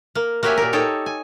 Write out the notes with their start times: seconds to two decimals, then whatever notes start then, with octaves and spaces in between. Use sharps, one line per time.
0.15 A#3
0.43 A#3 F#4 G4 C#5 E5 G#5
0.57 A#2 A#4
0.73 D#4 A4 C#5 G5
1.06 G#5